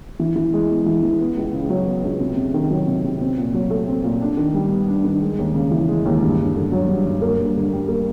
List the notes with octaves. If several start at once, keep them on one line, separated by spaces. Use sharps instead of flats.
E3
E3
G#3
B3
E3
E3
B3
C#2
C#3
F#3
B3
C#2
C3
C3
D#3
F#3
C3
C3
C4
A#2
F#3
A3
C4
A#2
D4
D#3
G3
B3
D4
D#3
G#3
D#2
C#3
E3
G#3
D#2
G2
G2
D3
F#3
G2
G2
A#3
G2
D3
G3
A#3